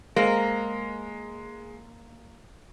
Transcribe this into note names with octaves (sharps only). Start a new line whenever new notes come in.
G#3 A#3 A#4 C5 D#5